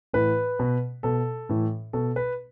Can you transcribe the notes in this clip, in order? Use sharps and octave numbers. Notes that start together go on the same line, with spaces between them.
A2 E3 B4
B2
B2 A4
A2 E3
B2 A4
B4